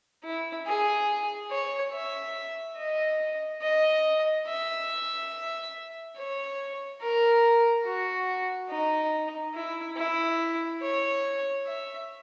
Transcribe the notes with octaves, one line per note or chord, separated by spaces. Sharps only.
E4
G#4
C#5
E5
D#5
D#5
E5
C#5
A#4
F#4
D#4
E4
E4
C#5
E5